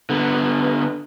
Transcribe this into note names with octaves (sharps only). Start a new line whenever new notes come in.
D3 B3